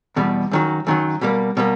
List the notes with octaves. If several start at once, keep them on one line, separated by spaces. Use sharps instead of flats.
E2 B2 G3
F#2 D#3 F#3
F#2 D#3 F#3
B2 G3 A#3
B2 G3 A#3